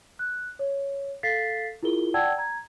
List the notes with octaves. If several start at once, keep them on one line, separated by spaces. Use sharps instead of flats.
F#6
C#5
A4 F5 A6 B6 C7
E4 F4 G#4 A#4 G7
D5 F#5 G5 A5 E6 G#6
A#5 G#6